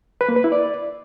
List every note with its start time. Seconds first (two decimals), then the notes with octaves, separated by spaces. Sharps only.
0.21 B4
0.29 A#3
0.36 B4
0.44 E4
0.52 D5